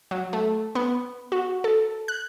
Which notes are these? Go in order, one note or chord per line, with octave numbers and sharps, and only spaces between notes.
F#3
A3
B3
F#4
A4
F#6